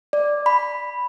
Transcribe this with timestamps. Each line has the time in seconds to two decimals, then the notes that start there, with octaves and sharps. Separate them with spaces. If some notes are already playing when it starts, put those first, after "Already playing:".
0.13 D5
0.46 B5